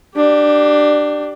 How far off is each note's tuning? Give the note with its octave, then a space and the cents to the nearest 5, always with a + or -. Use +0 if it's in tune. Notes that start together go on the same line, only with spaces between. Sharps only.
D4 +15 G4 -15